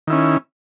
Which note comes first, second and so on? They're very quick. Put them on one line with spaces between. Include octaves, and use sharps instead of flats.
D#3 E4 C#4